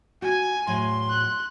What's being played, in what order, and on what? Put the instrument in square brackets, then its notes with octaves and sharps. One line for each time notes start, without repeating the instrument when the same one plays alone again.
[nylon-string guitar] F#4 [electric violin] G#5
[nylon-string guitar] E2 A2 F#3 [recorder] C6
[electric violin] F#6